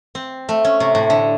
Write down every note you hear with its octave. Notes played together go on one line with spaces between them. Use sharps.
C4
A3
C#4
C3
A2
D3